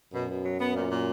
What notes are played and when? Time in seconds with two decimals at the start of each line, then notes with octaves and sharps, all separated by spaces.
0.13 F#2 B2
0.30 B2
0.44 F#3
0.60 B3
0.75 A#2
0.90 A#2